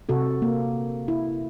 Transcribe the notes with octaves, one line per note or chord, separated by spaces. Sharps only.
C3 F#4 A4
A#3
E4